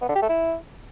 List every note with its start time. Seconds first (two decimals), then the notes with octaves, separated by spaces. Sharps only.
0.01 B3
0.08 D3
0.15 G4
0.22 A3
0.29 E4